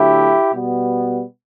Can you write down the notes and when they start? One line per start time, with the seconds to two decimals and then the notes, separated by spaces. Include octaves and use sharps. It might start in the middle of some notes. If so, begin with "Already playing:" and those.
Already playing: D3 F#3 A3 E4 G4
0.54 B2 G3 B3